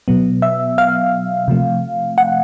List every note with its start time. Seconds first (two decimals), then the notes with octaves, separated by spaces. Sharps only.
0.08 B2 F#3 B3
0.42 E5
0.78 F5
1.48 C3 F3 A3
2.18 F#5